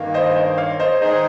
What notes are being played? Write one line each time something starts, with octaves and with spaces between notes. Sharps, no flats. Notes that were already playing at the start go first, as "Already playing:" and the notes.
Already playing: G2 D#3 A#3
C5 D#5
C5 D#5
C#5 F5
C5 D#5
D#3 G#3 D#4 G#4 C5 D#5